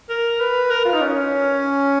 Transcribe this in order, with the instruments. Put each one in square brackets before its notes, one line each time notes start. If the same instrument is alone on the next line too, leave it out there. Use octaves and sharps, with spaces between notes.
[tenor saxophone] A#4
B4
A#4
F4
D#4
C#4